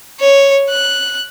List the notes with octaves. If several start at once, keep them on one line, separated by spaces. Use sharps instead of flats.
C#5
F#6